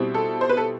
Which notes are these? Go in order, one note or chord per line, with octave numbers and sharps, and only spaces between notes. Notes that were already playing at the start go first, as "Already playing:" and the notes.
Already playing: B2 G3 C4 E4
A4
C5
B4
A4